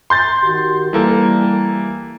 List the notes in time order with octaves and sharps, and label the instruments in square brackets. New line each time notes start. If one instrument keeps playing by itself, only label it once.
[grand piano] C6 G6 A6
[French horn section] D#3 F#4 G4
[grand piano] E3 A#3 A4 [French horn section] G3